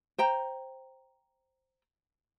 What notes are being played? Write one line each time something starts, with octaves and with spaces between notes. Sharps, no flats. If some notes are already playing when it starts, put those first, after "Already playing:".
C5 G5 A#5